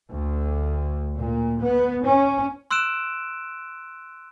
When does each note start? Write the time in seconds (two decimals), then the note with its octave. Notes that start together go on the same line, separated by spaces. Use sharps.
0.11 D2
1.16 A#2
1.61 B3
2.04 C#4
2.71 C6 E6 F#6 D7 E7